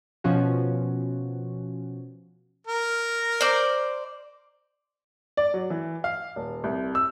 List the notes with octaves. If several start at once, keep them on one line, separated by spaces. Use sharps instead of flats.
B2 F3 C#4 F#4
A#4
C5 D5
D5
F#3
E3
F5
D#1
C2
E6